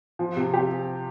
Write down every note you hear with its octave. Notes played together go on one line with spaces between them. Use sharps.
F3
C3
G4